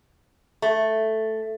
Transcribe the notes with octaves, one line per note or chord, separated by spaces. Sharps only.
A3